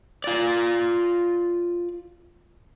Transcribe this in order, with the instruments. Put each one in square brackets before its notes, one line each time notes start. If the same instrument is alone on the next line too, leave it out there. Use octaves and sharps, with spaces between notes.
[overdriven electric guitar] F4 D5